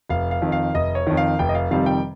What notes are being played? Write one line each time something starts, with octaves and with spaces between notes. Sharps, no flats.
F1 F5
F5
F2 D#3
F5
F1 D#5
C#5
F2 D#3
F5
F1 G5
D#5
F5
F2 C3 D#3 G3 F5
G5